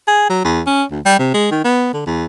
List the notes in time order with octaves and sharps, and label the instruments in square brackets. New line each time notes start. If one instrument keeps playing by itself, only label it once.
[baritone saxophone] G#4
F#3
E2
C#4
D2
G3
C3
G#3
D#3
B3
D3
E2